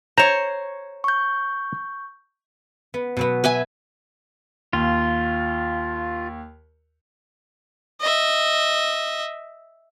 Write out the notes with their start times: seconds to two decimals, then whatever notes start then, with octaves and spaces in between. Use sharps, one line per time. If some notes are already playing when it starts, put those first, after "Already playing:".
0.18 C5 C#5 A#5
1.04 C#6 G6
2.94 B3
3.17 B2 F#3 B3
3.44 B4 E5 G#5
4.73 D#2 F4
8.00 D#5 E5